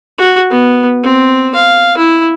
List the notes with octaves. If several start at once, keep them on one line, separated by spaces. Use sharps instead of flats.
F#4
B3
C4
F5
E4